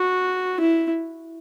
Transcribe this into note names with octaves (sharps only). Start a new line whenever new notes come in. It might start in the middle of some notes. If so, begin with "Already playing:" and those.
Already playing: F#4
E4